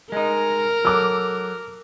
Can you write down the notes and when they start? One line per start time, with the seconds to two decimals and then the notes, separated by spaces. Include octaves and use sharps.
0.12 G#3 D#4 A#4
0.85 F#3 A4 D6 E6